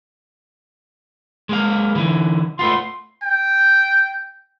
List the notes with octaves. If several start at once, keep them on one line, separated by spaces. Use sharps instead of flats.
G#3 A#3 F5
D3 E3
A3 B3 F4 C6
G5